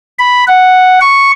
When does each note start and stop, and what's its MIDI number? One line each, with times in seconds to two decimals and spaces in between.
0.19 0.44 83
0.48 0.99 78
1.01 1.32 85